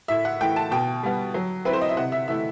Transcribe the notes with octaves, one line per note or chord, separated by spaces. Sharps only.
A2 E5
F#5
E3 A3 G5
A5
B2 G5
G3 B3
F#3
C4 E4 B4
C5
D#5
E5
C3 F#5
E5
E3 A3 E4 E5